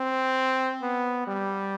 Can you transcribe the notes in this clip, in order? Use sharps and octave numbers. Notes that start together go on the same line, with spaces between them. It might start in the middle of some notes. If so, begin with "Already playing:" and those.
Already playing: C4
B3
G3